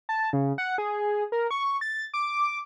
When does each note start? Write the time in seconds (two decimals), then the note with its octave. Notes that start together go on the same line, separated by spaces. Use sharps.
0.09 A5
0.33 C#3
0.58 F#5
0.78 G#4
1.32 A#4
1.51 C#6
1.81 A6
2.14 D6